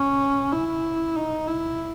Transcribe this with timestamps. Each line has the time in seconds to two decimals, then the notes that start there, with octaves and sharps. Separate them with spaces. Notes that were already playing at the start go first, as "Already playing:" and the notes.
Already playing: C#4
0.52 E4
1.16 D#4
1.48 E4